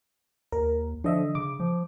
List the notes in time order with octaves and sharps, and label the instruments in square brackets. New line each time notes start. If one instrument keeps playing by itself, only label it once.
[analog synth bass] D#2 [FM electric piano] A#4
[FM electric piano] D3 D#5 E5 [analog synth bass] F3
[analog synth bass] C#3 [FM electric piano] D6
[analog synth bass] F3